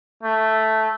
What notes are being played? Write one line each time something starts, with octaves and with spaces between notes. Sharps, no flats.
A3